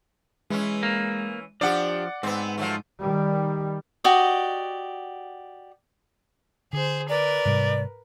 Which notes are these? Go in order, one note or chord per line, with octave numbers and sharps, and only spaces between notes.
E3 G#3 C#4
A#3
F3 D4 G4 D5 F#5
G#2 B3 C4
F3 F#3 A3
D#3 G3
F#4 G4 D5 D#5
D3 G#4 C5
A#4 B4 D5
G#2 C3 G3